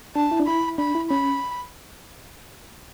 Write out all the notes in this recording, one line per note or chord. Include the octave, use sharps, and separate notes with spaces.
D4 A5
E4
D4
E4 B5
D4 B5
E4
C#4 B5